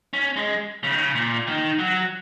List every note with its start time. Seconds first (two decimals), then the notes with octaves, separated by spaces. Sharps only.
0.13 C#4
0.36 G#3
0.84 C#3
0.92 D#3
0.99 C#3
1.15 A#2
1.47 D#3
1.79 F#3